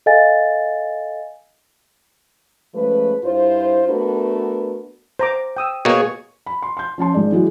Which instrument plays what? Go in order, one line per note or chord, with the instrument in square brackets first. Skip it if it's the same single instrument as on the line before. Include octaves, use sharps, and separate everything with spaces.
[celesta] A4 D#5 F5 G#5 A6
[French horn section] F3 G#3 A3 C#4 B4
G2 E4 F4 C5
A3 B3 D4 F#4 A#4 B4
[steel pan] C5 A#5 D6
G5 D#6 E6
[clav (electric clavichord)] B2 A#3 [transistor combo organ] G#4 C#5
[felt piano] B5
C6
C6 G6
F3 C#4 A5 C6
G#1 G#2 G#3 D5
E3 F#3 G#3 F#4